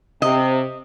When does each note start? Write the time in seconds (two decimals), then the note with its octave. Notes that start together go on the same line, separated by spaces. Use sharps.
0.22 C3 D#5